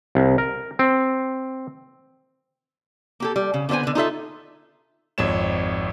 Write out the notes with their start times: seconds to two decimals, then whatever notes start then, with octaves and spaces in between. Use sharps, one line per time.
0.15 C2
0.38 A#4
0.79 C4
3.20 A#3 G4 A4
3.36 G3
3.54 C#3
3.69 D3 B3 D#4 C5 G#5
3.83 D3 B4
3.95 D#4 F4 A4 E5
5.18 G#1 F2 C#5 E7